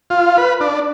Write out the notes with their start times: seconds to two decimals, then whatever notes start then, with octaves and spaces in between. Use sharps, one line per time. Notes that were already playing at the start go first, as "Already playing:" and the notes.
0.10 F4
0.38 B4
0.60 D4